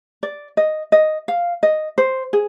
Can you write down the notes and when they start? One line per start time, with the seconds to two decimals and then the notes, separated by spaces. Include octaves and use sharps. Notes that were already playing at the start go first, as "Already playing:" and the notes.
0.23 D5
0.57 D#5
0.92 D#5
1.28 F5
1.63 D#5
1.98 C5
2.33 G#4